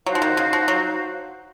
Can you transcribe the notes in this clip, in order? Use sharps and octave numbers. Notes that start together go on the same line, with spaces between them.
F#3 D#4 F#4 C5 F5
F3
D#3
C#3
F3
F#3